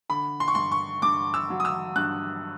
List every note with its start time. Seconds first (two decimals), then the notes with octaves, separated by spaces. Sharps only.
0.09 D3 B5
0.40 C6
0.48 C#6
0.55 G2 C6
0.72 C#6
1.02 G2 D6
1.34 E6
1.50 F#3
1.60 D#6
1.65 E6
1.96 G2 F#6